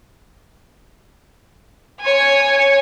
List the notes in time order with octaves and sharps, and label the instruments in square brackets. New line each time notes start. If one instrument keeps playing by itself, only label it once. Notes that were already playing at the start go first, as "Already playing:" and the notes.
[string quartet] C#5 G#5